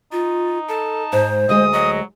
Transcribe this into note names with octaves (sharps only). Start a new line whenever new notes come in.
D#4 F4
A4 A5
G#2 C5
D2 G#3 D#5 D#6
F#3 D#5